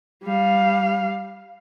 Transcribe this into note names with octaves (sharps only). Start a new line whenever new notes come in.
G3 F5